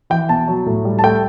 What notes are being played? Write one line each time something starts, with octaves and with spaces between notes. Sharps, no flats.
E3 G5
B2 A5
F#3
A2
G3
A5
A3 G5